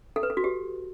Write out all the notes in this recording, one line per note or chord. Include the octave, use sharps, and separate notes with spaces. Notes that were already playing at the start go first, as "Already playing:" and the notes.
A4
B4
A4
F#4
G4